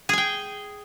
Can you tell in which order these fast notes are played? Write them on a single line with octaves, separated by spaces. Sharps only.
G#4 G#5 G5